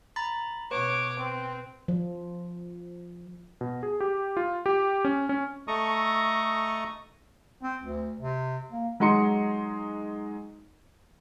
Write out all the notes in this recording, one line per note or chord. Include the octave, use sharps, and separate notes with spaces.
A#5 B5 A6
B2 B4 C#5 D6
C4
F3
B2
G#4
G4
F4
G4
C#4
C#4
A3 A4 D#5 A#5 C#6 D#6
C4
D2
C3
A#3
F#3 G#3 D#4 C6 C#7